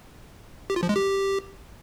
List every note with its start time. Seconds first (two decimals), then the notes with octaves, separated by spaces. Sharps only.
0.70 G4
0.76 F4
0.83 F3
0.89 G#3
0.96 G4